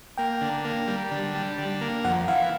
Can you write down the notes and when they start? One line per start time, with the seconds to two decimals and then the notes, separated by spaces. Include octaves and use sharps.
0.18 A#3 G5
0.41 D3
0.65 A#3
0.88 G3
1.11 D3
1.34 G3
1.58 D3
1.81 A#3
2.04 F2 F#5
2.28 E3 F5